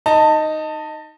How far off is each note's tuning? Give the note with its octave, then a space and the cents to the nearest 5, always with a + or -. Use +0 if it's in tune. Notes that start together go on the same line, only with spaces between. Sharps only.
D#4 +0 A5 +25